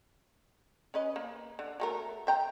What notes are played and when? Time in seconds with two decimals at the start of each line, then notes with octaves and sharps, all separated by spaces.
0.94 C#4 B4 D#5
1.16 A#3
1.59 D3
1.80 F#3 A3 A#4
2.27 E5 G5 A#5